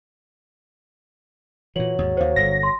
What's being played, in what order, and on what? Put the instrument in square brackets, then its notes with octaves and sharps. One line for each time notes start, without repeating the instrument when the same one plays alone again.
[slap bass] A#2 E3 [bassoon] F#3 [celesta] F#7
[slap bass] D#2 G#2
[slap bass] D#2 D#3 [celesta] C5 F5
[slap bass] G1 D3 [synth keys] A#6
[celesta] C6